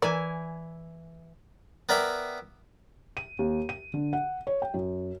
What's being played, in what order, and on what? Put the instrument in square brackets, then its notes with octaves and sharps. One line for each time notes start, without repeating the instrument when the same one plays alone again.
[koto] E3 E4 G#5 [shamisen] A#4 D5
[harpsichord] B3 A#4 D5 E5 G5
[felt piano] D#7
D#2
D#7
D3
F#5
C#5
G5
F#2